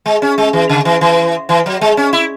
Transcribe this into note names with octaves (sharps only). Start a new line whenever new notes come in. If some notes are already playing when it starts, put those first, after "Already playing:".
G#3
C#4
G#3
E3
C#3
E3
E3
E3
F#3
G#3
C#4
E4